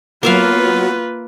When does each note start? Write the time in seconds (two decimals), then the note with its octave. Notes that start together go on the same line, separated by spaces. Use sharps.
0.23 F#3 A#3 B3 F4 B4 E5 F5